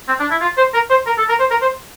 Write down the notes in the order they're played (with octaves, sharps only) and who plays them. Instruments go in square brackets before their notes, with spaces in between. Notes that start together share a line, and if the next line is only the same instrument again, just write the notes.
[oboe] C4
D4
E4
F4
C5
A#4
C5
A#4
A4
A#4
C5
A#4
C5